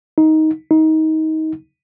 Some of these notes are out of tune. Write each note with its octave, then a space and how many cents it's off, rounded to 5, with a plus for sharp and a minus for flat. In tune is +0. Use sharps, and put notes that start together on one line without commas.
D#4 +15
D#4 +25